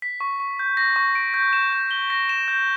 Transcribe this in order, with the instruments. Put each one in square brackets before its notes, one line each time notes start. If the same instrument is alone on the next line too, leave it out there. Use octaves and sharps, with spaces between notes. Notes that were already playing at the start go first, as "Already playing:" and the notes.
[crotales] B6
C#6
C#6
G6
A#6
C#6
D7
G6
E7
G6
G7
A#6
E7
G6